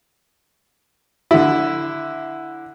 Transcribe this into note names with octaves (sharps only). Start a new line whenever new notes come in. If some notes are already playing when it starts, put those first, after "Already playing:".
D3 E4